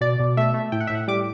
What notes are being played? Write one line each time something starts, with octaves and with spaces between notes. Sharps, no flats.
B2 D5
B2
A3 E5
A3
A2 G5
F#5
E5
A2
F#5
G3 D6